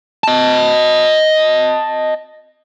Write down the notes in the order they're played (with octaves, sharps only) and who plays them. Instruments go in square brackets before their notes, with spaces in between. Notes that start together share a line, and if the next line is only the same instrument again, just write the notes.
[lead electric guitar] D#5 A5